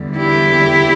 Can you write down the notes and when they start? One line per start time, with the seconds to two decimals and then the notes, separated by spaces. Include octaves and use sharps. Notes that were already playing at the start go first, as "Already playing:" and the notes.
Already playing: E2 D3 G3
0.17 E4 G4